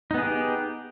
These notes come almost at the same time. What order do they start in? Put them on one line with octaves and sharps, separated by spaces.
D#4 B3 G#4 G4